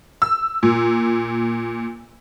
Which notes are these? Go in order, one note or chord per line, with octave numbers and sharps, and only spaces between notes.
E6
A#2